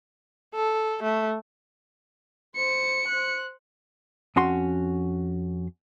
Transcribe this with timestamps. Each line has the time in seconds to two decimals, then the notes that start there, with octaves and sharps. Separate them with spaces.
0.54 A4
1.03 A3
2.56 C5 C#7
3.07 C5 F#6
4.36 F2 C#4 F#4 C6